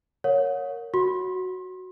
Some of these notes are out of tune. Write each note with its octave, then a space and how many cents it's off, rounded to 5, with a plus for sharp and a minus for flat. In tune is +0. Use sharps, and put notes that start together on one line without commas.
A#4 -5 C#5 +5 F#5 -40
F#4 +0 C6 +35